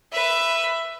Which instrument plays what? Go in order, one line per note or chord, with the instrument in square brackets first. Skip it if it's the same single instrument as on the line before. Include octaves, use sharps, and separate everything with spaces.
[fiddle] B4 E5